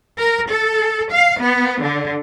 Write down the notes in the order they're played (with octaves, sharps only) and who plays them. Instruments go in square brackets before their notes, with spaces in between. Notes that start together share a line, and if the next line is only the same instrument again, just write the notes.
[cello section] A#4
A4
F5
B3
D3